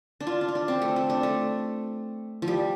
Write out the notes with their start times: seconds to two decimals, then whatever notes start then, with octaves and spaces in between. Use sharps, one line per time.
0.20 D4
0.27 F4
0.41 D4
0.48 F4
0.55 D4
0.68 C4
0.82 A3
0.96 A3
1.10 D4
1.23 A3
2.42 F3
2.48 G3